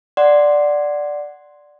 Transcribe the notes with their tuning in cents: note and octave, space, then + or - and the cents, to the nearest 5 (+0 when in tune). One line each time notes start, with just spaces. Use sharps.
D5 +0 F#5 +0 C6 +0